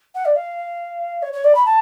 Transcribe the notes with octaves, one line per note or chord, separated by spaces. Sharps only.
F#5
D5
F5
C#5
C#5
D5
B5
A5